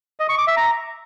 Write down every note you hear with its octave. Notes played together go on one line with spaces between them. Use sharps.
D#5
C#6
D6
E5
A#5